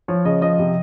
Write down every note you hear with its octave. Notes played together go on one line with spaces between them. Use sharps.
F3 C#5
C#3 D#5
F3 D#5
C3